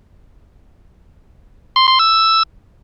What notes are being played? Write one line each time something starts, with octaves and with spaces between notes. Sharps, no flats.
C6
C6
E6